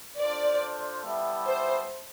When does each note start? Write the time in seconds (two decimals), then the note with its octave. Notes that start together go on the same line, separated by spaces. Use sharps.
0.21 D4 F4 A4 C5 D5
1.05 G3 B3 E4 A4 E5
1.47 C5